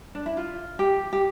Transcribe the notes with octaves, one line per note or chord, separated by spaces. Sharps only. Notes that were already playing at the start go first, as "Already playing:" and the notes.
D4
E4
F4
G4
G4